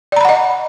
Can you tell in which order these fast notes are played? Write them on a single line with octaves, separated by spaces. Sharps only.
D5 A#5 B5 F#5 D#5